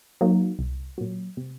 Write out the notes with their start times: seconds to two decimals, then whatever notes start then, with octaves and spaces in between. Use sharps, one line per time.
0.21 F#3 A#3 D#4
0.59 C2
0.98 A#2 F#3
1.37 C3